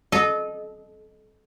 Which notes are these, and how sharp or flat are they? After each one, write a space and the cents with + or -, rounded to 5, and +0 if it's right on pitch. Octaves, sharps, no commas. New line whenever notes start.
A4 -30 D#5 -10